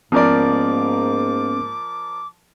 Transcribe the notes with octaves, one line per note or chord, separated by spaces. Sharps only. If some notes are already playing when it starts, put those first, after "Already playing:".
G#2 F3 A#3 B3 C#4 A#4 D5 D6